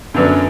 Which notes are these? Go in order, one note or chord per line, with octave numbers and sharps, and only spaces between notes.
F#2 D3 F#3 B3 D4